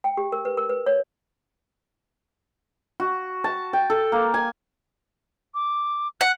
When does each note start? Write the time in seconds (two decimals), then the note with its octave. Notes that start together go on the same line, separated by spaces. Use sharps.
0.04 G5
0.17 G4
0.32 A#4
0.45 B4
0.57 A#4
0.69 B4
0.86 C#5
3.00 F#4
3.44 A5
3.73 G5
3.90 A4
4.12 A#3
4.34 G#5
5.54 D6
6.21 F#5 F#6